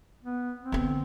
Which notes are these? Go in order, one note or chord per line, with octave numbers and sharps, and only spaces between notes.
B3
C4
D3 B3